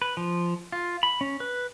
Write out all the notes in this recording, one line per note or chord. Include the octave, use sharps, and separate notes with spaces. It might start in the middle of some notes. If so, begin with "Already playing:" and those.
B4
F3
F4
B5
C#4
B4